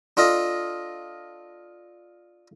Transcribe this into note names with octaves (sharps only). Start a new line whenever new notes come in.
D4 F4 A4 D#5